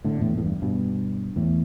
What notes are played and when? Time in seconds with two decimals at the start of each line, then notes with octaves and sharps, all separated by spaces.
0.04 A2 D3
0.21 E2 A2
0.37 E2 A2
0.46 G2
0.62 G2 B2
1.36 E2 A2